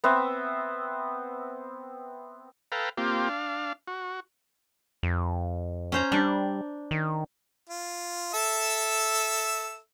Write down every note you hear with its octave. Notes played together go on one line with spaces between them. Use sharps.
B3 C4 E5
A4 B4 F5 G5 A#5
A#3 C4 F4 G4
D4 F5
F#4
F2
C#4 C5 A#5
G3 D4
D#3
F4
A4 E5 E6